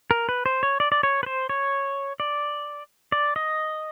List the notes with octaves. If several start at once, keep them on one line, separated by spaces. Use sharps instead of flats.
A#4
B4
C5
C#5
D5
D5
C#5
B4
C5
C#5
D5
D5
D#5